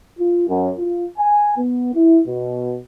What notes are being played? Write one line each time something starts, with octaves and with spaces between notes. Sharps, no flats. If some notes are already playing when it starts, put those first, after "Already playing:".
F4
F#2
F4
G#5
B3
E4
B2